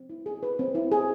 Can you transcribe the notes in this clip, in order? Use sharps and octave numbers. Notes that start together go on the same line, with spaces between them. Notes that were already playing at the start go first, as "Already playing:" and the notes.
Already playing: C4
E4
G#4
B4
C4
E4
G#4